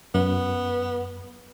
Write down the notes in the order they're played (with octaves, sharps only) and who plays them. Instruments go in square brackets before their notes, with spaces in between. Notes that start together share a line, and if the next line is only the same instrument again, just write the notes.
[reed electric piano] F#2 [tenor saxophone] B3